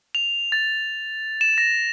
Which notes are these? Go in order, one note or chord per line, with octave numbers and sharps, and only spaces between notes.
F7
A6
E7
A#6